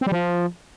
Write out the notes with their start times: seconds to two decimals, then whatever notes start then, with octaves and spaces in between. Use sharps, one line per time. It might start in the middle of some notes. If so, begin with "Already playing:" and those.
0.01 C4
0.07 G3
0.12 F3